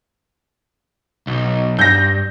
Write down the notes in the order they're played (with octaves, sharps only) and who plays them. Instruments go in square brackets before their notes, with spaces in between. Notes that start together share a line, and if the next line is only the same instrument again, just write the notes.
[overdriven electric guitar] B1
[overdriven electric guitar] G2 [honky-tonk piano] G6 A#6